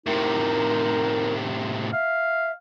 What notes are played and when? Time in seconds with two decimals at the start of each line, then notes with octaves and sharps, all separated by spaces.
0.06 A2 C3 D#4 A#4
1.93 E5 F5